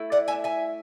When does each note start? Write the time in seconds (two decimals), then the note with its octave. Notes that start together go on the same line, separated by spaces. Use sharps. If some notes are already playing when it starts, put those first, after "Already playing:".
Already playing: A3 E4
0.12 D5 F#5
0.28 E5 G#5
0.44 E5 G#5